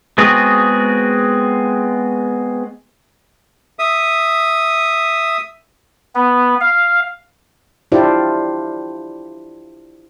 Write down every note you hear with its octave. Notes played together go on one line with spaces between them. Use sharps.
G#3 B3 C4 F#4 G#4
E5 D#6
B3
F5
D4 E4 F4 G4 C5 D5